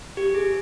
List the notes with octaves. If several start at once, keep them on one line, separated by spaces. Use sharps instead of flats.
G4
G#4